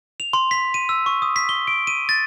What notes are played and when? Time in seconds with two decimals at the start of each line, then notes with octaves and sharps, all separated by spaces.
0.20 F7
0.33 C6
0.51 B6
0.74 D#7
0.89 E6
1.06 C#6
1.22 D#6
1.36 B6
1.49 G7
1.67 D7
1.87 D#7
2.09 A6